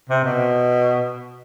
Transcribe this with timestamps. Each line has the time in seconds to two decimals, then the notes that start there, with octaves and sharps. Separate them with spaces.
0.09 C3
0.24 B2